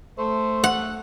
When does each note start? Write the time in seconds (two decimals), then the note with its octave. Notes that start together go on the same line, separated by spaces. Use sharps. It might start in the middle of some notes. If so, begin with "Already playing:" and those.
0.18 A3 C5
0.64 F#5